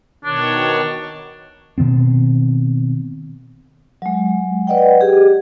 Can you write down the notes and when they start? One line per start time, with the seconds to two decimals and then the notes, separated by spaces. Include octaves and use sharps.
0.25 B2 D#3 D4 C#5
1.78 B2 D#3 B3 C4
4.02 F#3 G#3
4.67 B4 D5 D#5 F#5 G5
5.01 G4 G#4